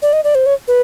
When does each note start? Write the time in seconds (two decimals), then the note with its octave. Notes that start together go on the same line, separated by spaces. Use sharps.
0.02 D5
0.13 D#5
0.24 D5
0.35 C5
0.46 C#5
0.68 B4